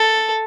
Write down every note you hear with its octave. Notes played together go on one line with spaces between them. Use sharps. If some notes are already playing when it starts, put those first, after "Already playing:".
Already playing: A4